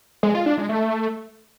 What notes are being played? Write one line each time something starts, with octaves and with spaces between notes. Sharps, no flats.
G#3
F4
D4
G#3
A3